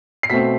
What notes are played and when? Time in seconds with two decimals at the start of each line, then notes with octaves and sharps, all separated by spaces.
0.23 C7
0.30 B2 A3 C4 B6